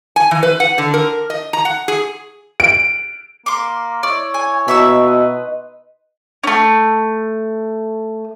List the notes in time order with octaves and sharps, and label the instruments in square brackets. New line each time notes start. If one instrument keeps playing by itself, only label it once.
[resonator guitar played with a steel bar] G#5
E3
B4
F#5
D3
A#4
D#5
A#5
F#5
G#4
[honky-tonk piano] D7
[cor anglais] A#3 [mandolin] C6 D6
[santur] E4 E5 [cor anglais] C#5 [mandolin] D5
[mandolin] G#5
[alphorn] B2 [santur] A#3 D#4 [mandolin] E5 C#6 E6
[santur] B4 D#5 C6
[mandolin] A3 C#4